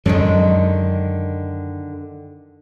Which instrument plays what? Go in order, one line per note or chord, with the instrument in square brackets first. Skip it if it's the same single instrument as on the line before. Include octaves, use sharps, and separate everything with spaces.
[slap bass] F#2 F#3 [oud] D3 D#3 G#3